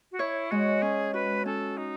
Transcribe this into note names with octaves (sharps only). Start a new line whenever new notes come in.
F#4
E4 C#5
G#3 F#4
C#4 G#4
F#4 B4
C#4 A4
D#4